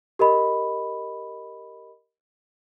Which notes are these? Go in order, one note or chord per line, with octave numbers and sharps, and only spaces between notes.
G4 A#4 D#5 B5